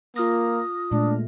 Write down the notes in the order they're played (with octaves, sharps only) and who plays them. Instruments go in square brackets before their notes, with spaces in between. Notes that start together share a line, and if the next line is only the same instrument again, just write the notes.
[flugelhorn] A#3 [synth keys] F4 F6 A#6 [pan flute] D#6
[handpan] A#2 G#3 A3 [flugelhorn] D4